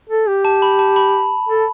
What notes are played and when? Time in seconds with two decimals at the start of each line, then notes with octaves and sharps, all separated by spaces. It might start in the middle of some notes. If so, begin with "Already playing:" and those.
0.10 A4
0.27 G4
0.45 A5
0.62 B5
0.79 A5
0.96 B5
1.49 A4